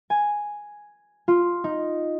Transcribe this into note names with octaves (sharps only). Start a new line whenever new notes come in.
G#5
F4
D#4